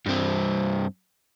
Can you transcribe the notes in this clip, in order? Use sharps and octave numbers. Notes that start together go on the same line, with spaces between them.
G2 C4